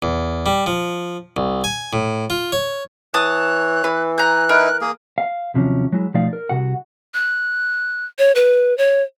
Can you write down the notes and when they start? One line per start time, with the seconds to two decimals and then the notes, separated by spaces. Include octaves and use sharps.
0.02 E2
0.46 G3
0.66 F3
1.37 C2
1.64 G#5
1.93 A2
2.30 F4
2.52 C#5
3.14 E3 C#5 A5 D#6 F#6
3.84 E3 B4
4.18 G#5 A#5 F#6 G6
4.49 D#4 E4 A#4 B4
4.81 A#3 G#4 D#6
5.18 F5
5.54 D#2 C3 F3 F#3 C#4
5.92 F#3 G#3 E4
6.14 B2 F3 A3 D#4 D5 F5
6.33 A#4
6.49 C2 G2 C3 F#4 F#5
7.14 F#6
8.19 C#5
8.35 B4
8.78 C#5